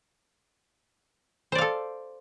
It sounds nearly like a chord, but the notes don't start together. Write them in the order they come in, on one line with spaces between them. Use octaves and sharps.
C5 D5 F5 A4